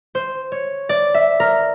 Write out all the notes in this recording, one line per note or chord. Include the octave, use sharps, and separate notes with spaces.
C5
C#5
D5
E5
A#4